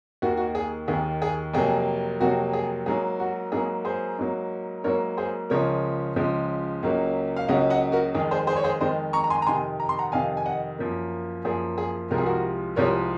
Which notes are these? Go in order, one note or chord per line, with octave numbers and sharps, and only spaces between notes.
D#2 D#3 A#3 F#4
F#4
G#4
D#2 D#3 A#3 G#4
G#4
F2 C3 F#3 A#3 G#4
F2 C3 F#3 A#3 F#4
G#4
G#2 F#3 A#3 G#4
F#4
G#2 F#3 A#3 G#4
G#4 C5
G#2 F#3 A#3
G#2 F#3 A#3 A#4 C#5
G#4 C5
C#2 C#3 F3 G#3 A#4 C#5
C#2 C#3 F3 G#3
C#2 C#3 F#3 A#3
F5
C#2 C#3 F#3 A#3 D#5 F#5
D#5 F#5
F#4 A#4
F2 D#3 G#3 G#4
G#4 C5
G#4 C5
C#5
G#4 C5
F2 D#3 G#3 C5 D#5
A#5 C#6
A#5
G#5 C6
A#5
F2 C3 D#3 G#5 C6
A#5
C6
F#5 A#5
F2 C3 D#3 F5 G#5
G#5
D#5 F#5
F#2 F3 A#3
F#2 F3 A#3 G#4
G#4
C2 C3 F3 G#3 A#4
G#4
F#4 A#4
C2 C3 F3 G#3 A#4 C#5